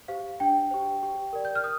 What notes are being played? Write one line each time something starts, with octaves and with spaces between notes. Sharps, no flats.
G4 C5 F5
D4 G5
G4 C5
G4
A#4 D5
G6
F6
D#6